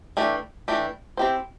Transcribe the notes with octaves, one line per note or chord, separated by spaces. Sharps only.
E3 A3 D4 G4
E3 A3 D4 G4
C4 E4 G4 C5